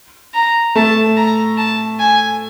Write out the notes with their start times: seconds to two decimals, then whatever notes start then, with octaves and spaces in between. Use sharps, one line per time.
0.34 A#5
0.75 A3 A5
1.17 A#5
1.57 A5
1.99 G#5